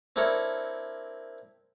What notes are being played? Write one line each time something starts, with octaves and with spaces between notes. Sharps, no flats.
C4 D4 E4 A4 A#4 C#5